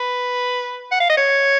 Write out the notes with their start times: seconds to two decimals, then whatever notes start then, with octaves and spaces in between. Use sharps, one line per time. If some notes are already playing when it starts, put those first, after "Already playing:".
Already playing: B4
0.91 F#5
1.00 F5
1.09 D#5
1.17 C#5